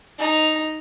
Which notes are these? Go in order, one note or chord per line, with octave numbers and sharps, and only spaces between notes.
D#4 A#5